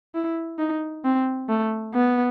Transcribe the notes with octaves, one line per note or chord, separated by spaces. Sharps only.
E4
D#4
C4
A3
B3